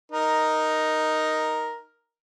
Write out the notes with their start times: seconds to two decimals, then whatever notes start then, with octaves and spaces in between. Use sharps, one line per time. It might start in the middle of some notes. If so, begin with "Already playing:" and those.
0.12 D#4 A#4